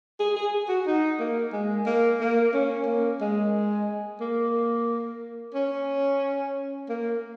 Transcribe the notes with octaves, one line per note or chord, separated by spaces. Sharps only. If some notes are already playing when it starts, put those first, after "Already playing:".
G#4
G#4
F#4
D#4
A#3
G#3
A#3
A#3
C#4
A#3
G#3
A#3
C#4
A#3